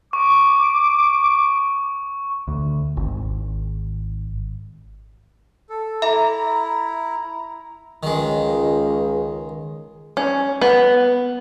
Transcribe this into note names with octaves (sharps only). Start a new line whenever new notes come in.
C#6 D6
D2
G#1
A4
E4 A4 E5 A#5
C#2 D#3 G#3
C#4
B3